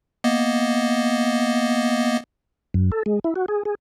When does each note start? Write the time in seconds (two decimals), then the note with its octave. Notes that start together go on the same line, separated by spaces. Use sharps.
0.24 A#3 B3 D#5
2.74 F#2
2.92 A4
3.06 G#3
3.24 E4
3.36 F#4
3.48 G#4
3.65 G#4